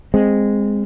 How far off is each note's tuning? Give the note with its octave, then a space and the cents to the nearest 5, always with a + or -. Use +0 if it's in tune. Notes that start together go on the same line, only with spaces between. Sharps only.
G#3 -10 C4 +0